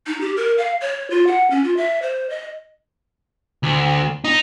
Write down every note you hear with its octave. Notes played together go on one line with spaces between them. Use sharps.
D#4
G4
A#4
F5
C#5
F4
F#5
C#4
F4
E5
C5
D#5
D2
D#4